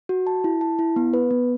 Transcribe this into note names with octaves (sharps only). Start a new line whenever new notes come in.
F#4
A5
E4
A5
E4
B3
B4
B3